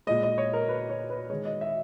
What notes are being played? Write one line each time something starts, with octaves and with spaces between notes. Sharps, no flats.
A#2 G#3 D#5
D#5
C#5
A#4
B4
C#5
B4
D#3 G#3 C#5
D#5
E5